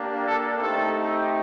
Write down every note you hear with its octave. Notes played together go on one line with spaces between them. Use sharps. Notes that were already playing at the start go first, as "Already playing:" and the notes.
Already playing: A#3 D4 G4
A4
A3 C4 D#4 G4 A4